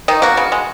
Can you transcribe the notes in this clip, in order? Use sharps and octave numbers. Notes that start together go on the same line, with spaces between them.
D#3 D#4
A#3 F#4
C#3
G#3